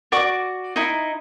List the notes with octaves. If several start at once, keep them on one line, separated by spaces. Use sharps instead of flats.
F#4 D5 C#6 D6
D#4 E4